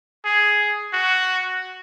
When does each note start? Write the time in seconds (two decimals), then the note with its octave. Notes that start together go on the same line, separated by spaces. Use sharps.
0.24 G#4
0.93 F#4